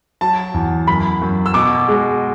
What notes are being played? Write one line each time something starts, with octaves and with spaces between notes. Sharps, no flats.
F#3 A5
E2
F#2 B5
F#2
E6
B2 D6
G#3